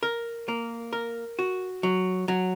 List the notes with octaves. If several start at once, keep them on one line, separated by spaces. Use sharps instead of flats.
A#4
A#3
A#4
F#4
F#3
F#3